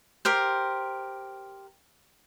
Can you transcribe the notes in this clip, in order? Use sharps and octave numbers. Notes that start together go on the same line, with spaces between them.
G4 A#4 C5